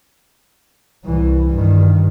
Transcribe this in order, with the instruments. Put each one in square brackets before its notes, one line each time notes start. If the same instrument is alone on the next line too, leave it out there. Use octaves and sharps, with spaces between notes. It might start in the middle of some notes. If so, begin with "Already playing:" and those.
[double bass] C2 E3
G2 D#3